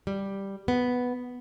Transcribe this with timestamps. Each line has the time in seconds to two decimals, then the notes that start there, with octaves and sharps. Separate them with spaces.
0.07 G3
0.68 B3